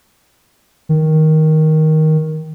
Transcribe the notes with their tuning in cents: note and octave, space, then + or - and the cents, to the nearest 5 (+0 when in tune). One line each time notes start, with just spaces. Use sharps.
D#3 +10